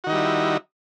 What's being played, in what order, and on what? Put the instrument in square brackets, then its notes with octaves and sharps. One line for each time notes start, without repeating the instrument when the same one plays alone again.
[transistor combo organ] F#4
D#3
D#4
G3
E4